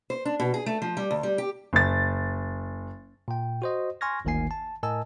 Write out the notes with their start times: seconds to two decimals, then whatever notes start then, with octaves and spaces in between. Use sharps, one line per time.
0.10 C5
0.25 D4
0.40 B2
0.54 G#4
0.66 A3
0.82 F3
0.97 G3
1.11 D2
1.23 G3
1.38 G4
1.73 F#1 A6
3.28 A#2 G5
3.62 F#4 C5 D#5
4.01 G#5 C6 C#6 F6 G#6 A#6
4.25 G1 D2 D#3 A#3 G#5 C7
4.51 A5
4.83 A2 A#4 D#5 G#5 A5 E6